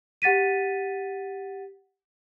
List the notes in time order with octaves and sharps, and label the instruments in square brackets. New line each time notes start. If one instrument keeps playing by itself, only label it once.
[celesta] G4 F#5 A6 B6 D#7